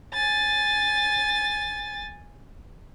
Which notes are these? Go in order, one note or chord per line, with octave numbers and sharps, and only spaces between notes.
G#5 A6